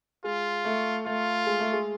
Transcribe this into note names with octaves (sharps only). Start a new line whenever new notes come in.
G#3 F4
A3
A3 F4
G#3
A3
G#3